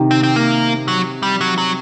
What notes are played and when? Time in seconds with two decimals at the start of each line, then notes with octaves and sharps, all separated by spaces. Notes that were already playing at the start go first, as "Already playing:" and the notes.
Already playing: C3 D#3
0.11 C4
0.23 C4
0.36 A#3
0.88 F#3
1.23 G3
1.41 F#3
1.58 F#3